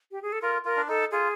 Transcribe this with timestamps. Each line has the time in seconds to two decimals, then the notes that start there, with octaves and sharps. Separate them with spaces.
0.11 G4
0.22 G#4
0.32 A4
0.42 F4 A#4
0.65 F4 A#4
0.76 D4
0.88 D#4 A4
1.11 F4 G#4